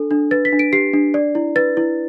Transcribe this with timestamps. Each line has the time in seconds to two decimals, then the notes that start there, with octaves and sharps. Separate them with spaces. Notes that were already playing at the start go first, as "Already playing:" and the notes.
Already playing: D4 A4
0.11 D4
0.31 B4 A6
0.45 B6
0.52 D4
0.59 D7
0.73 G4 C7
0.94 D4
1.14 D5
1.35 E4
1.56 B4 A6
1.77 E4